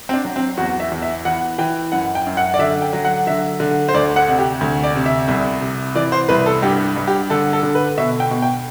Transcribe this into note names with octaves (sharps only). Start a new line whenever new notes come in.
C4
D4
F#3
C4
E2 F#4
E5
E2
E5
E3 F#5
E3 G5
F#2 F#5
G5
F#2
F#5
D5
D3 E5
G5
F#3
F#5
D3 E5
D3
C5
D2 D5
F#5
C3
G4
D2
D5
C3
E5
C2
C3
E3 D5
C5
C2 B4
A4
G2 G4
G2
G4
D3 A4
A4
D3
B4
B2 E5
G5
B2
G5